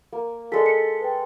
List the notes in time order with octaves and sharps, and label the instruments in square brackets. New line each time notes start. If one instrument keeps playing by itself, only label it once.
[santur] A#3
[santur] G#3 A4 [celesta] D5 F5 B6
[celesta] B6 C#7
B4 G5